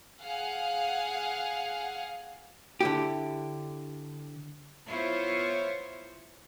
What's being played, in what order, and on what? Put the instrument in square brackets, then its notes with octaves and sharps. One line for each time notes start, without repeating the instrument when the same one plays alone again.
[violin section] G#4 F5 F#5
[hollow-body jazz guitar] D3 E4 G4
[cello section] B3 E4 F4 C5 C#5